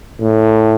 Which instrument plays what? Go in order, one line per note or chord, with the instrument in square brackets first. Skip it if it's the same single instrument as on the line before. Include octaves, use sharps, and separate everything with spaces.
[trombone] A2